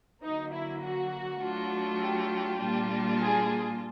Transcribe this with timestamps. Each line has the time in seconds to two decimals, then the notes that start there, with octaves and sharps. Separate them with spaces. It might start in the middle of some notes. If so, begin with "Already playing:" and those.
0.23 D3 F#3 A#3 D#4
0.54 E4
0.82 F#4
1.41 F#3 A3 D4 F4
2.00 G4
2.60 A#2 G3 A#3 D4 F4
3.19 G#4